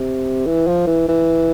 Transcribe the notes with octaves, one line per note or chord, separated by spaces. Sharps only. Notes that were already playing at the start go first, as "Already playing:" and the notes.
Already playing: C3
E3
F3
E3
E3